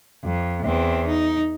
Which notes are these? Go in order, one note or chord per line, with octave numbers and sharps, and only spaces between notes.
F2
E2 C4
D#4